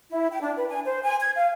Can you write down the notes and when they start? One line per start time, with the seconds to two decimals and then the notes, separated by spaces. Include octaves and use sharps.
0.10 E4
0.31 G5
0.42 D4
0.57 B4
0.69 G#5
0.85 C5
1.03 G#5
1.20 G#6
1.36 F5